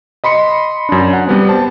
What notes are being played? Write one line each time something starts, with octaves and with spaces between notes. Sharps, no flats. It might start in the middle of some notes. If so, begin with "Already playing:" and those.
D#5 B5 C6 C#7
F#2 D4
F#5
G3 B3 C4
C5 A5